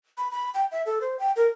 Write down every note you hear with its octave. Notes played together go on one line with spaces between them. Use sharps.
B5
B5
G5
E5
A4
C5
G5
A#4